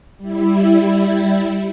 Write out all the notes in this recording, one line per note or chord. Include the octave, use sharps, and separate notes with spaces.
G3 E4